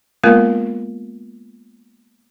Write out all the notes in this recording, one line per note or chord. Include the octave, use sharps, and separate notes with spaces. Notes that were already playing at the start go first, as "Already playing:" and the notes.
G#3 A#3 B3 F4 A#4